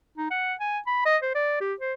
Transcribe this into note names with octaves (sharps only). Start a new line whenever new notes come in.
D#4
F#5
G#5
B5
D#5
C5
D5
G4
C5